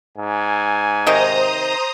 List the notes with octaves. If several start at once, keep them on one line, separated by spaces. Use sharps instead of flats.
G#2 G#5
C3 D#3 D#4 C5 A#5 D#6